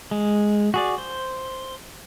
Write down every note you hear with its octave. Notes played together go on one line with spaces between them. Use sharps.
G#3
F#4 G#4 D5
C5